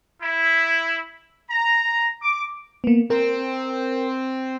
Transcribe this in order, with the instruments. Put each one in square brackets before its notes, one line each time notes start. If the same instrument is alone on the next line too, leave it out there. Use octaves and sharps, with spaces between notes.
[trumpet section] E4
A#5
D6
[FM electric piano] A#3 B3
[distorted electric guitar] C4 [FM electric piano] A#4